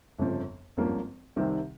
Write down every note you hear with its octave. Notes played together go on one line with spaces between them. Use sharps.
G1 F2 C#3 F3
G#1 G2 F3 A#3 C#4
C2 C3 D#3 G3 C4